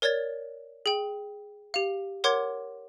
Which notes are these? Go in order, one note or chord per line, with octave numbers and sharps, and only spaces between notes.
A#4 C#5 D5 G#6 A6
G#4 G5
G4 F5
A#4 C#5 F#5 C6 D6 G#6